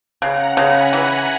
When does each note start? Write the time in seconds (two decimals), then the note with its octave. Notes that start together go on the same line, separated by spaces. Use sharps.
0.22 C#3 F#5 A#5
0.57 C#3 G#5 B5
0.93 E3 F#5 A#5